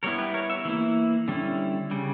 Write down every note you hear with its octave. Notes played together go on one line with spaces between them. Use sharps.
G3 B3 E4 A#4 C#5
G4 B4
A#4 C#5
C#5 E5
E3 A#3 E4
D3 G3 C#4 E4
C#3 G3